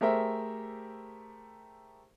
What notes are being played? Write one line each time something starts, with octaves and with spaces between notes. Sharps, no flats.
A3 G4 G#4 A#4 C5 E5